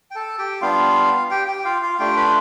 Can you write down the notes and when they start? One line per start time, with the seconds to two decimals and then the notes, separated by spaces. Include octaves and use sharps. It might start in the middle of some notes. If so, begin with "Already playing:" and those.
0.11 G5
0.15 A4 A5
0.39 G4 G5
0.61 G3 B3 D4 F4 F5
1.31 G4 G5
1.48 G4 G5
1.65 F4 F5
1.82 F4 F5
1.99 A3 D4 F4 G4 G5
2.16 B4 B5